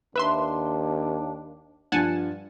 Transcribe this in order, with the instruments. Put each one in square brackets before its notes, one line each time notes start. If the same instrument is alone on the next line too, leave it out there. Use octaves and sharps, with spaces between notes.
[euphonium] D#2 [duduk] D4 [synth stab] B4 E5 C6
[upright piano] G2 F3 [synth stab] F#5 G#5 A5